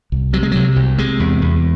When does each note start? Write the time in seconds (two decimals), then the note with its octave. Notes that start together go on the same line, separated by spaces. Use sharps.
0.12 C2
0.33 C3 F#3
0.43 G#3
0.51 C3 F#3
0.76 C2
0.98 C3 G#3
1.20 E2
1.42 E2